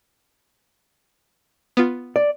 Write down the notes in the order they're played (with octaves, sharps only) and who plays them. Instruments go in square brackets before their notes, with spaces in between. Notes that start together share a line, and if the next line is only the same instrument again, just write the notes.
[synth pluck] B3 F4
[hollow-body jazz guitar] D5